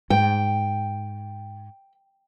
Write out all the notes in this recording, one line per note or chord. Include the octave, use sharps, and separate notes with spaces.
G#2 G5